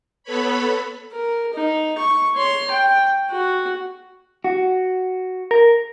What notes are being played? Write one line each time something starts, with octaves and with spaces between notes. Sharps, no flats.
B3 A4 B4 C#5 B5
A#4
D#4
C#6
C#5 C6
G5
F#4
F#4
A#4